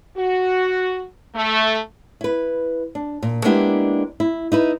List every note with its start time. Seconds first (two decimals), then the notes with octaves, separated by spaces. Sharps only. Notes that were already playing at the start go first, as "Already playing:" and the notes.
0.18 F#4
1.35 A3
2.21 E4 B4
2.95 D4
3.23 A#2
3.44 G#3 A#3 B3 D4 E4 G4
4.20 E4
4.52 D#4 E4 B4